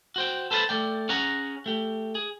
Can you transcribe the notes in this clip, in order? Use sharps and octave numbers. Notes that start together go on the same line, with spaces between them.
F#4 C5 G5
A4 B4 C5 E5 A5 B5
A3 D5 G5
C#4 G#4 C#5 F#5 A#5
A3 G4
G#4